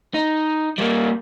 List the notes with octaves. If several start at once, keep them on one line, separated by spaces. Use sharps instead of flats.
D#4
G3 A#3